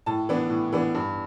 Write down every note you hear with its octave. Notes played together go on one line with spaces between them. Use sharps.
A2 A5
E3 B3 D4
A2
E3 B3 D4
G2